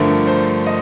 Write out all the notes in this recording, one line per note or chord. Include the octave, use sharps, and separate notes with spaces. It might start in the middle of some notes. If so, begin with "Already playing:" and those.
Already playing: G2 D3 F3 A3 A#4
C5
D#5